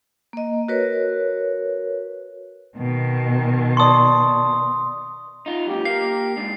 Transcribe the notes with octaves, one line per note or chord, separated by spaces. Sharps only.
A#3 D#5
F#4 A#4 B4 C#5
B2 D#3
D5 A5 C6 C#6 D#6
D#4 F4
F#2 A#2 G4
A#3 A#4 F5 C7
G#2 D4